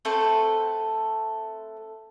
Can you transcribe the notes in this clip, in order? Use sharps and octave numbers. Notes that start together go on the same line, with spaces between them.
A3 C4 A4 B4